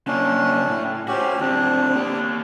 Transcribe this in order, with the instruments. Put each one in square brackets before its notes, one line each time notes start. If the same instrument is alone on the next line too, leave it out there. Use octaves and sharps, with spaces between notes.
[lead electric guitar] C#3 A#3 [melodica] C#4 D4
[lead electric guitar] A2
[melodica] C#4 G4 [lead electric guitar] F#4 C5
[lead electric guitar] D2 C4 [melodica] D4
[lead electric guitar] A#3 G4